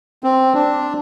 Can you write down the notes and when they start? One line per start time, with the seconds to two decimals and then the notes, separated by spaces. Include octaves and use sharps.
0.24 C4
0.54 D4